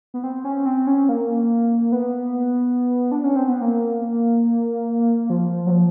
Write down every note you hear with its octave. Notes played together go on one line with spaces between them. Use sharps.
B3
C4
C#4
C4
C#4
A#3
B3
D4
C#4
C4
B3
A#3
F3
F#3
F3